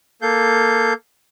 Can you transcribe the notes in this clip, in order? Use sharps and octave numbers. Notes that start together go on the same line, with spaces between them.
A#3 A4 F5 G6